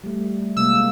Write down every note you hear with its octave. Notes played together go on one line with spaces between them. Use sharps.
G3 A3
C3 G#3 A#3 E6